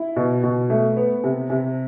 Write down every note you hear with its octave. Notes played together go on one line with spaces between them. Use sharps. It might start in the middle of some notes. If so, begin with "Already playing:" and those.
Already playing: E4
B2
B2
A3
B3
C3
C3